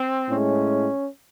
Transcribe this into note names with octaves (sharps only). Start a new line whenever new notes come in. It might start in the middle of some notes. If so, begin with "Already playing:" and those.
Already playing: C4
A2 G#3 C#4